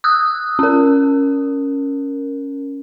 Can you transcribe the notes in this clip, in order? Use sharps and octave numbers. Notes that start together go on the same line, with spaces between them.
D#6 E6 F#6
C#4 A#4